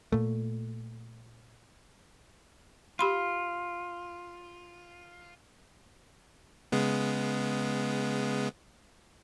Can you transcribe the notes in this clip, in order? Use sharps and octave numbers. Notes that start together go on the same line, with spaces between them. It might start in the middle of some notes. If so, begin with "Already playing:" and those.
A#2 A3
F4 G4 B5 C6
C#3 G#3 B3